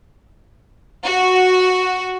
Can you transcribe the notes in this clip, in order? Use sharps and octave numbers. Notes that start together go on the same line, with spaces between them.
F#4